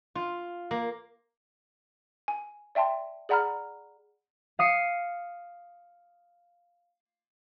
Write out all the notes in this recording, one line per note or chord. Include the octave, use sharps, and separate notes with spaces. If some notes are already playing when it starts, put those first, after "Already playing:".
F4
A#3
G#5
D5 E5 G5 A5 C6
G#4 D5 F#5 A#5 B5 F6
F5 D#6 C7 C#7